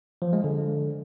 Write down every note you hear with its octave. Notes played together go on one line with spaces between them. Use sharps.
F3
G#3
D3